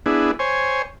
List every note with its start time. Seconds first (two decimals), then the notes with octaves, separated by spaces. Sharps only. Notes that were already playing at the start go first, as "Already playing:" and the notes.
0.06 B3 D4 E4 G#4
0.39 C5 C#5 G#5